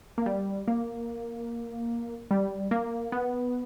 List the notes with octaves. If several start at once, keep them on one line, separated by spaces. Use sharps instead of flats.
A#3
G3
A#3
G3
A#3
B3